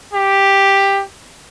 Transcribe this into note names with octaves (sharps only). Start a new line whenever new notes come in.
G4